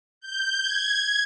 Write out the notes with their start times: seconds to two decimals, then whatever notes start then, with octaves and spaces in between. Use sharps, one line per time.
0.20 G6
0.59 G#6